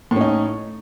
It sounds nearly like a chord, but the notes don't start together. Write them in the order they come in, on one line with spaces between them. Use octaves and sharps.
A2 C#4 D#4